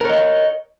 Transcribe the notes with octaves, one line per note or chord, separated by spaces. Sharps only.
A#4 C#5 D#5